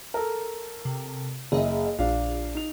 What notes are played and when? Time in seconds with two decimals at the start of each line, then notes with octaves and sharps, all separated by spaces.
0.14 A4 A#4
0.85 C3
1.52 F#1 G#4 D#5 E5
1.99 A#1 D4 F5
2.55 D#4 F7